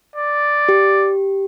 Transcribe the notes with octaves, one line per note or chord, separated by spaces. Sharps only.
D5
G4